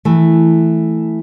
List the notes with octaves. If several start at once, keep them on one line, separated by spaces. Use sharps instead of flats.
E3 A3